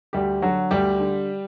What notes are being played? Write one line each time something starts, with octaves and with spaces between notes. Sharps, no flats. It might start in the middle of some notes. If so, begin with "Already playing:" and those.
D2 G3 G4
D3 F#3 F#4
D2 G3 G4
D3